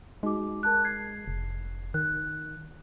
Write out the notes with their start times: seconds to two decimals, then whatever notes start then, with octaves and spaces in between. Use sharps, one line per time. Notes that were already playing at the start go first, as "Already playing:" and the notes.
0.23 G#3 D#4 F#4 D6
0.63 A#4 A5 F#6
0.84 G#6 C7
1.28 F1
1.94 D#3 F#6